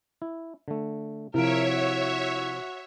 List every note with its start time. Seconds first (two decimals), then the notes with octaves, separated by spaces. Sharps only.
0.22 E4
0.68 D3 A3
1.34 C3 F3 E4 A#4 C#5 E5 D7
1.69 F#4